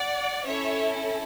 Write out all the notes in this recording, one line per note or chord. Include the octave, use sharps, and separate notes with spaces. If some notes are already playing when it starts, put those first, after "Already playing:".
Already playing: D5 F#5
C#4 E4 A4 C#5 E5